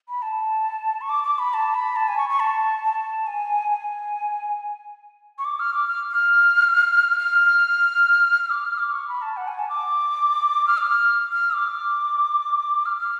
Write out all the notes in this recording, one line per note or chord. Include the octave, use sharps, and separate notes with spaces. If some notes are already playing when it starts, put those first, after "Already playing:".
B5
A5
C#6
D6
D6
B5
A5
B5
A5
G#5
C#6
C#6
A5
A5
G#5
G#5
C#6
D6
F6
D6
F6
F6
F6
F6
D6
F6
D6
C#6
B5
A5
F#5
G#5
A5
D6
F6
D6
F6
F6
D6
F6
F6